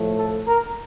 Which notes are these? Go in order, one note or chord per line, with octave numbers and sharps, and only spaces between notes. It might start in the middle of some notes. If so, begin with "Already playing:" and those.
Already playing: A2 F3 A3
A4
A#4